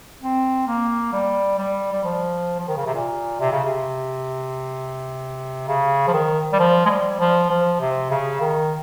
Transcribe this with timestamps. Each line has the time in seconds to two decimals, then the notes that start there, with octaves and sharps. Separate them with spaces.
0.22 C4
0.67 A#3
1.13 G3
1.58 G3
1.93 G3
2.04 F3
2.59 F3
2.68 D#3
2.77 C#3
2.86 C3
2.95 A#2
3.40 C3
3.52 C#3
3.64 C3
5.68 C#3
6.07 F3
6.13 D#3
6.53 G3
6.59 F3
6.86 G#3
6.90 G3
7.20 F3
7.50 F3
7.81 C3
8.11 C#3
8.41 D#3